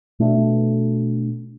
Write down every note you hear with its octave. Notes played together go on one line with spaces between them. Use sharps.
B2 A3 D4